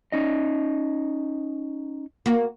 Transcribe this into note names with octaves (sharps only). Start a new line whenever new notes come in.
C#4 D#4 D#5
A#3 F#4